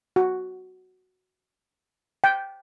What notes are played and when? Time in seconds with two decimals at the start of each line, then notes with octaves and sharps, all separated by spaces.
0.16 F#4
2.24 G5